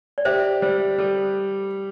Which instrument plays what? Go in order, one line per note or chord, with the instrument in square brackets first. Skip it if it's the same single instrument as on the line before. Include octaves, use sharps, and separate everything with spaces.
[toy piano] D5
[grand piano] G4 [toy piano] C5 E5
[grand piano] G3 [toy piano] C5
[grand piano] G3 [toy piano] A4